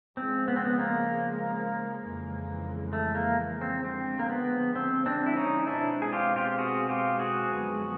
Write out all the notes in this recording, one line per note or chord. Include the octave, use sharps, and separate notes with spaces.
C#3 F3 G#3 C4
B3
C4
B3
A#3
F2 C#3 E3 G#3
A3
A#3
C4
D3 F3 G#3 C4
A#3
B3
C4
C4 D4
E4
C#4 D#4
B2 G#3 C4 D4 E4
G#4
F4 G4
F4 G4
F#4 G#4
F4 G4
F#4 G#4
F#2 D3 F3 G#3 B3